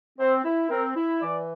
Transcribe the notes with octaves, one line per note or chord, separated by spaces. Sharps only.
C4 C5
E4
C4 A#4
E4
E3 D5